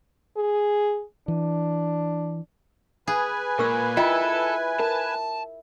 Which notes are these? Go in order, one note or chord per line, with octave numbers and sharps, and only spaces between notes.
G#4
E3 D4
G#4 B4 G#5
A#2 A#4 C#6 E6
E4 F4 A4 D#5 G5
A#4 A5